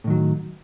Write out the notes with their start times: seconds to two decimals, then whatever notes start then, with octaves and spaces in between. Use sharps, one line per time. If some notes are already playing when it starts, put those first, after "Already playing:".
0.04 A2
0.07 D#3
0.10 F#3